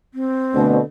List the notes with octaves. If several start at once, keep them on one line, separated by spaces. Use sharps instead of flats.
C4
D2 B2